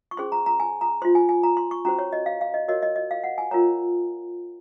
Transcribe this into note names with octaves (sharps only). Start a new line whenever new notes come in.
C#6
C#4 G#4 C5 C6
A#5
A#5
G#5
A#5
F4 C5 C6
G#5
G#5
A#5
C6
C#6
C#4 F#4 C5 A#5
C#5
D#5
F5
F5
D#5
F#4 A#4 C#5 D#5
D#5
D#5
F5
F#5
G#5
F4 A#4 C#5 A#5